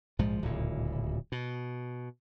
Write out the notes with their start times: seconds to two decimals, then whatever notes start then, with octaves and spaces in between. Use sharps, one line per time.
0.19 A#1 G#2 F3 G#3
0.42 D1 C#2 A#2
1.32 B2